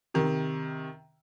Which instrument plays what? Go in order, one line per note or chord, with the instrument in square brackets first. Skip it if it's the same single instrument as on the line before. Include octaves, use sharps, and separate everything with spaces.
[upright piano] C3 D#3